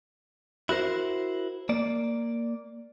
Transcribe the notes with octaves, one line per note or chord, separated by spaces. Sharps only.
E4 F#4 A#4 C5
A#3 D5